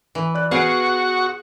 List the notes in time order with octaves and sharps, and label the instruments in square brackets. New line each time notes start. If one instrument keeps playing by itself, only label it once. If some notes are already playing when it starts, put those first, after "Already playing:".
[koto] E3
[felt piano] D5 F#6
[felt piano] B3 D7 [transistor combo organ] F#4 C#6 [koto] G#4 F5